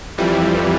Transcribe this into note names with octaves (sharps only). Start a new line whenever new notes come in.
F2 E3 G3